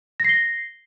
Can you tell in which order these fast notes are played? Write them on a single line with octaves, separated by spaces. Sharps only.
A#6 C7 G7